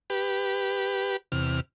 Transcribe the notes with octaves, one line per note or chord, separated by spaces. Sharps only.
G4 B4
E2 C3 F6